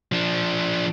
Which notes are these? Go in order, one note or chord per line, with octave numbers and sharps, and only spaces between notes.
F3 D4